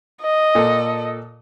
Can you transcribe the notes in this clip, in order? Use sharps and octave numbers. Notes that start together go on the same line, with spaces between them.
D#5
A#2 A4